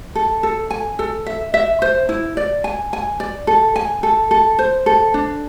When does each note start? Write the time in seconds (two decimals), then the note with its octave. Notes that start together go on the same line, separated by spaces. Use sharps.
0.15 A4
0.43 A4
0.70 G#5
0.99 A4
1.26 E5
1.54 E5
1.82 C5
2.09 E4
2.37 D5
2.64 G#5
2.93 G#5
3.20 D5
3.47 A4
3.76 G#5
4.03 A4
4.31 A4
4.59 C5
4.86 A4
5.14 D4